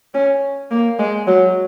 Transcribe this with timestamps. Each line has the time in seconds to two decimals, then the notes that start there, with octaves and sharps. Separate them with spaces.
0.14 C#4
0.71 A#3
0.99 G#3
1.27 F#3